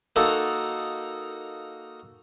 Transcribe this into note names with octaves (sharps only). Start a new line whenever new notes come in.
A#3 D#4 F#4 A4